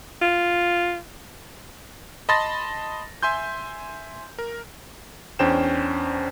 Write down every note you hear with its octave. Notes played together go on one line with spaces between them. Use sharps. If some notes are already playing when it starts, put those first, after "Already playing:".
F4
D#5 A5 B5 C6 A6 A#6
E5 G#5 C6 G6
A#4
E2 C#4 D4 C5 G5 E7